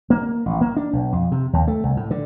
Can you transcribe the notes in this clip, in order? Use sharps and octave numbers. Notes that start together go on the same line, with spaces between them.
A#3
A1
A#3
D4
B1
F2
C3
D#2
A3
C2
A2
D3